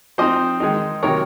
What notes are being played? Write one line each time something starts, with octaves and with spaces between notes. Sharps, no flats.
F3 C4 D#4 C5 D#5
D#3 G#3 D#4
C3 D#3 F#3 A#4 C#5